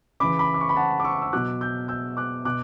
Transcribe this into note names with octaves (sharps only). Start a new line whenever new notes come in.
C#3 E3 B5 D6
B5 D6
D6
C#6
B5
F#5 A5
D6
C#6 E6
E6
B2 F#3 D6 F#6
E6 G6
E6 G6
D6 F#6
B2 D6 F#6